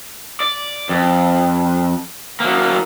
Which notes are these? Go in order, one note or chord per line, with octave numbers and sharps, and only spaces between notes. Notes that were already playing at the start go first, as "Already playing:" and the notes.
D5
F2
F#3 A#3